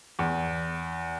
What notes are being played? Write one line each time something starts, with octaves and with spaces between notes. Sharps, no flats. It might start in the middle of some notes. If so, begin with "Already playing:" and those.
E2